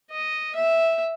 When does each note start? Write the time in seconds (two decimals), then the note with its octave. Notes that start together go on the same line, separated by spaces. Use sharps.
0.11 D#5
0.55 E5